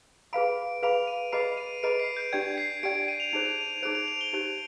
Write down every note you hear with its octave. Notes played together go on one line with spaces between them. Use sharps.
G#4 B4 F5 B5 D7
G#4 B4 F5 B5 F7
D#7
G#4 B4 D#5 B5 C7
D#7
G#4 B4 D#5 B5 D7
C7
G6
D4 G4 D5 G5 G#6
C7
D4 G4 D5 G5 D7
D7
D#7
F7
D#4 G#4 C5 F7
D#7
F7
F7
D#4 G#4 C5 D7
F7
F7
G7
D#4 G4 C5 F7